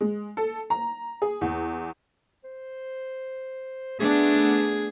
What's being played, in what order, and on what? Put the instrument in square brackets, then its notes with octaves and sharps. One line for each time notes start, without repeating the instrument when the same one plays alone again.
[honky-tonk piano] G#3
A4
A#5
G#4
E2
[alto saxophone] C5
[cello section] A3 B3 D4 [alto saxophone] G#4